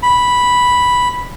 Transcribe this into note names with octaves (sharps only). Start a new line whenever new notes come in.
B5